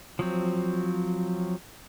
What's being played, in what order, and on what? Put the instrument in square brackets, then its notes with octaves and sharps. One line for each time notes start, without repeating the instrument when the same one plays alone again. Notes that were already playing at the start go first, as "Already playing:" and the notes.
[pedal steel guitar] F3 F#3 C4